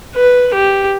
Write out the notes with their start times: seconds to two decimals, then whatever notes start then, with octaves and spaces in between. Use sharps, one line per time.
0.15 B4
0.54 G4